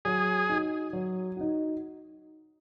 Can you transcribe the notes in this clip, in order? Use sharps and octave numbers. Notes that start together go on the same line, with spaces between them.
F#3 G#4
D#4 F#4
F#3
D#4 F#4